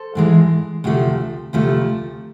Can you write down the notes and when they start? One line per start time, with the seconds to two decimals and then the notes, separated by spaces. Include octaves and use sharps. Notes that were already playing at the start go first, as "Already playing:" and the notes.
Already playing: A4 C5
0.15 G#2 E3 G#3
0.84 D2 C3 F3 A3
1.53 D2 C3 F3 A3